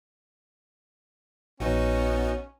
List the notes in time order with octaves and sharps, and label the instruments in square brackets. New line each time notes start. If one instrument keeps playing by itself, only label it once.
[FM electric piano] A#1 [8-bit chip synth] B3 D#4 F#4 [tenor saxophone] C#4